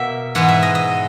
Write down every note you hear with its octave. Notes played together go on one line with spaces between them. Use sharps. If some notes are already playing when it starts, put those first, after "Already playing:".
Already playing: B2 A#3 A#4 E5 F#5
G#2 E3 G#3 B3 F#5
E5
D#5
D#5